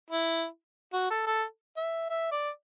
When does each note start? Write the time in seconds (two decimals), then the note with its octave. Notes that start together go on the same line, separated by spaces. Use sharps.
0.11 E4
0.93 F#4
1.10 A4
1.27 A4
1.77 E5
2.10 E5
2.32 D5